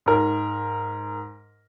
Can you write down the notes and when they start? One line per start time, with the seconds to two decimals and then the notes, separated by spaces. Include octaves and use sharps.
0.06 G#2 A#4